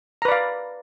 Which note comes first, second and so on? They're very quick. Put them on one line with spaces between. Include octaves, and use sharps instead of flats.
A#5 B4 D5 F5